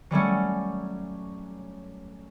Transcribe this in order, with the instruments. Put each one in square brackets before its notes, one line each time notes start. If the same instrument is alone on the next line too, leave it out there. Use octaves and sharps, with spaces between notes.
[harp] F#3 G3 A3 C#4